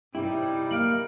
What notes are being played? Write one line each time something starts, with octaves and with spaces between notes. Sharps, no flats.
C3 G3 D#4 E4 G5
A#3 F6 D7 F#7